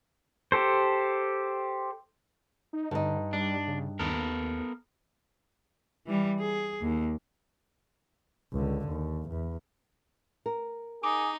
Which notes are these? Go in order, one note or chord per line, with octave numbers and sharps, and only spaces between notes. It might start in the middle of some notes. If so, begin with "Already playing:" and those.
G4 A4 C5
D#4
G2 D3 D#4
G3 D4
C#3
D#2 B3 A4 A#4
E3 G3
G#4
D#2
C#2 D3
D#2
E2
A#4
D#4 G#4 D6